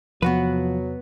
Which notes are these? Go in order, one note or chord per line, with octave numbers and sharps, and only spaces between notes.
E2 C3 F3 F#3 B3 F#4 B4